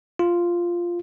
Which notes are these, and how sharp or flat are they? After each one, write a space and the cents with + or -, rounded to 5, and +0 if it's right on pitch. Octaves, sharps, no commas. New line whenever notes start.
F4 -5